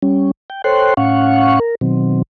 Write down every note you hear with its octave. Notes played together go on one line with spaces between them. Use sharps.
G3 C#4
G5
A4 C5 C#5 G5 C6 F#6
A2 C#4 F5 F#5 C#6
A#4
B2 D#3 F#3 C4